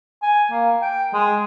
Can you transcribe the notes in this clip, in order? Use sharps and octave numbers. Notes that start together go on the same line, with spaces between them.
G#5
A#3
G5
G#3